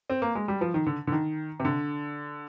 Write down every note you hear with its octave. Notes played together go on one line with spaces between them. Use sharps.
C4
A#3
G#3
G3
F3
D#3
D3
D3
D#3
C3
D3